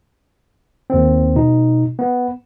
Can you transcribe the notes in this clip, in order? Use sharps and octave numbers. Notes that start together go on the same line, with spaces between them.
D#2 C4
B2 D#4
B3